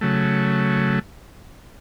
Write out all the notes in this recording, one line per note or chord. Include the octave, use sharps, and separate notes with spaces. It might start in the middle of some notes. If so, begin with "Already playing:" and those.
C#3 F#3 A3